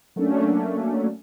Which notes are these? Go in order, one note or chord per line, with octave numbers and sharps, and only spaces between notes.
F#3 A3 A#3 C#4 D4